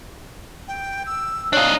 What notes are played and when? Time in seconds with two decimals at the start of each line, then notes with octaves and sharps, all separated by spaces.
0.68 G5
1.06 E6
1.53 D4 D#4 C#5 F5 F#6